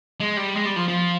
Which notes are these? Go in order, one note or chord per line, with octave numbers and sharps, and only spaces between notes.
G#3
G3
G#3
G3
F3
F3